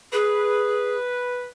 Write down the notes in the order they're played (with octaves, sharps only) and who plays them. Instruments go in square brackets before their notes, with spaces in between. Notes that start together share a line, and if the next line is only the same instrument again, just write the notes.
[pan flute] G#4 [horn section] B4